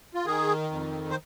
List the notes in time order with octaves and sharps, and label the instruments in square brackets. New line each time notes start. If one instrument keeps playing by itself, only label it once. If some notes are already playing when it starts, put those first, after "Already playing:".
[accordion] F4
D#3 G#4
F2
C5